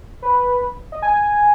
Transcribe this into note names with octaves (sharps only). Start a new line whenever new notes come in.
B4
D#5
G#5